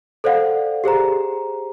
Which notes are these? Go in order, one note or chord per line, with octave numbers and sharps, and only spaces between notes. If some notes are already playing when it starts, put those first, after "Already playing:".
A4 C5 D5 F5 F#5
G4 G#4 C5 A#5